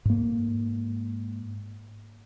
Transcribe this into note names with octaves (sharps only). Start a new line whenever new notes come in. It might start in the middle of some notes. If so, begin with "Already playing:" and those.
G#2 A#3